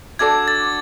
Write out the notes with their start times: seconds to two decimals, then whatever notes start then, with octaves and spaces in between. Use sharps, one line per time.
0.19 D4 F#4 A4 D5 G#6
0.48 A6